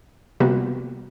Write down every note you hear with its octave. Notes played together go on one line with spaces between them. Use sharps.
C3 F3 G3 A#3 B3 F#4